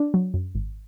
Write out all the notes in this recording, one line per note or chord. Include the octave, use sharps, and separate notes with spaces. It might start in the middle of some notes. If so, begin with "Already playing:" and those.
Already playing: D4 D5
F#3
F#2
G#1